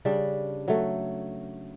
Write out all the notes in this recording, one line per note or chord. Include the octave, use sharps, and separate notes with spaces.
C#3 G3 D4
F#3 A3